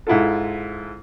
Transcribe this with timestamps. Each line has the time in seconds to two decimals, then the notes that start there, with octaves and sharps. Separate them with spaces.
0.07 G#2 E4 F4 A4